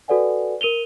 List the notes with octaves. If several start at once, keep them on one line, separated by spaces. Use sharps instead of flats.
F#4 A4 B4 D5 F#5 G#5
A#4 D#7 F7 G7